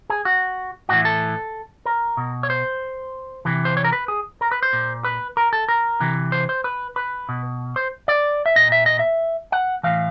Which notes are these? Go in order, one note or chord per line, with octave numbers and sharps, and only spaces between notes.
G#4
F#4
A2 E3 F#4
A4
A#4
B2
C#5
C5
C3 E3
C5
C#5
A#4
B4
G#4
A#4
B4
C5
A#2
B4
A#4
A4
A#4
C3 E3
C5
C5
B4
B4
B2
C5
D5
E5
A#2 D#5
E5
D#5
E5
F#5
A2 E3 F5